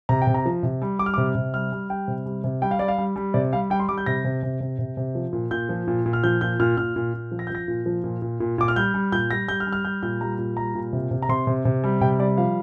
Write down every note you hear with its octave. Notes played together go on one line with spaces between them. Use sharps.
C3 A#5
G5
C3
A#5
F3
C3
G3
G3 D6
F6
C3 D6
C3
G3 F6
G3
G3 G5
C3
G3
C3
G3 G5
F5
G3 D5
F5
G3
G3
C3 D5
G3 F5
G3 G5
C6
G3 D6
G6
C3 A#6
C3
C3
C3
C3
C3
F3
A#2
A#2 G6
F3
A#2
A#2
F6
F3 G6
A#2 G6
A#2 F6
A#2 F6
A#2
A#2
F3
A#6
G6
F3 A#6
A#2
F3
A#2
A#2
A#2
A#2 D6
F6
G3 G6
G3
A#2 G6
G3 A#6
G3 G6
F6
G3
F6
G3 G6
A#2 G6
G3 A#5
A#2
G3 A#5
A#2
C3
C3
A#5
C3 C6
C3
C3
G3
C3 G5
G3 D5
F3 F5